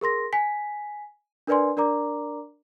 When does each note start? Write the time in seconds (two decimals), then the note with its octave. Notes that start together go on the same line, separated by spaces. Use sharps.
0.01 G#4 A#4 C6 A#6
0.33 G#5 B6
1.47 D4 A#4 B4 D5 G#5 C6
1.77 D4 A#4 D5 A#5 D6